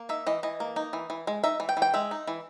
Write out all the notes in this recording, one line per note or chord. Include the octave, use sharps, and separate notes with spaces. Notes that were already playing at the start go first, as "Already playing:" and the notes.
Already playing: A#3
D#4 E5
E3 D#5
E3 D#5
A#3
D#4
E3
E3
G#3
D#4 E5
E3
G5
E3
G5
G#3 E5
D#4
E3